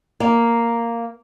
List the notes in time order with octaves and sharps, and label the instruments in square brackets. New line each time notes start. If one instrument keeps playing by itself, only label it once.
[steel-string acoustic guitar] A#3